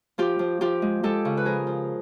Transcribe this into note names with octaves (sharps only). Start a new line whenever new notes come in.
F3 F4 G4
F3
F3 F4 G4
G#3
G#3 G4 A4
C#3
B4
F3 G#4 A#4
F3